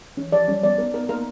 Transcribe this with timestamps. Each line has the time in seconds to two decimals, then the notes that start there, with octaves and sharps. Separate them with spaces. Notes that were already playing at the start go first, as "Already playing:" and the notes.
0.17 E3 C#4
0.32 F3 D5
0.48 G3 C#4
0.63 B3 D5
0.78 B3 A#4
0.94 B3 A#4
1.09 A#3 A#4